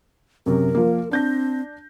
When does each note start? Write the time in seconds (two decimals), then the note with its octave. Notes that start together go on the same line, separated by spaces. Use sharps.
0.46 F#2 C3 A#4
0.75 F3 A#3
1.11 C4 D4 G6 A#6